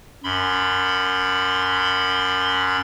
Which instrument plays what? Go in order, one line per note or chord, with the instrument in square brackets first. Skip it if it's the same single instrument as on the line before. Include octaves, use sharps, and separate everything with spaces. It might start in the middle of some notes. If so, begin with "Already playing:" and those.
[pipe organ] F#2 B5 C6